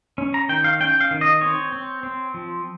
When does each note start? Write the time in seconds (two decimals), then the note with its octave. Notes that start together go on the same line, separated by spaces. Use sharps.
0.18 C#4
0.34 A#5
0.49 D#3 G5
0.64 F5
0.80 C#4 G5
1.01 F5
1.11 D#3
1.21 D#5
1.41 C4 C#5
1.72 C4
2.03 C4
2.34 F3